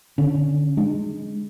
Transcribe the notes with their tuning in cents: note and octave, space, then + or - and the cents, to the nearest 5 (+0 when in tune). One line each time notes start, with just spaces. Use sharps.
D3 +0 C#4 +0
G#3 +0 D4 +40